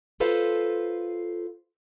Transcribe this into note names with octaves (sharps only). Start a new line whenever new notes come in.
F4 A4 B4 C5 F5